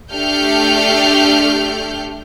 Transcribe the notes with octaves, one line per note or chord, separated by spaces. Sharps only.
A3 D4 G4 A4 F6 G6